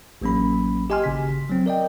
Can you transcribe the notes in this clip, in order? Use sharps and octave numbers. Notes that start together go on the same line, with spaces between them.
A1 F#3 A#3 C#4 B5
G4 D#5 G#5 C6 F6
G#1 C#3 B6
F#3 C4
A#4 D5 D#5 G5